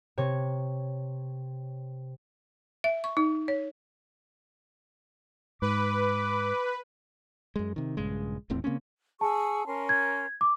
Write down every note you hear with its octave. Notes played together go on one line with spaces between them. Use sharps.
C3 C#5
E5
C#6
D#4
C#5
G#2 B4 D6
F#2 G#3
C3 D#3
A#1 G2 C#3 G#3
D#1 E2 A2 C4
C#3 A#3 C4 C#4
G#4 A5 C#6 E6
C#4 A#4 C6
G#6
D6